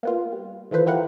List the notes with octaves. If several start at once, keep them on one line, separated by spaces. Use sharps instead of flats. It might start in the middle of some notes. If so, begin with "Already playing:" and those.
A#3 B3 F4
G3
D#3 E3 F4 A4 B4 C5
E4 F4 G4 A#4 B4 F#5